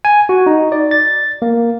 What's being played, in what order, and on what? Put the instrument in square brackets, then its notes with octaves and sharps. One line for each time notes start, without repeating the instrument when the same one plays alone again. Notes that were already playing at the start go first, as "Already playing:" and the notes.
[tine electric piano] G#5
F#4
D#4
D5
A6
A#3